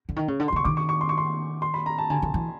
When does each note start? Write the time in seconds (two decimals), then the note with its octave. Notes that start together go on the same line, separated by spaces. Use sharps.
0.09 D3
0.16 D#3
0.28 C#3
0.40 D3
0.48 C6
0.52 D3 C#6
0.65 D#3 D6
0.77 C#6
0.89 C#6
1.01 C6
1.09 C#6
1.18 C6
1.62 C6
1.74 B5
1.86 A#5
1.98 A5
2.10 D3 G#5
2.22 D3
2.34 E3